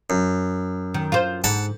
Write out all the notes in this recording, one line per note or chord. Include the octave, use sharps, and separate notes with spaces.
F#2
D#3
F4 C5
G#2 F#5 A5 B5